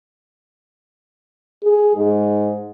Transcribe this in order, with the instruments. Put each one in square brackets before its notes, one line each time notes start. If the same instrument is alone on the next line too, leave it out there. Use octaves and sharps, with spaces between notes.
[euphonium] G#4
G#2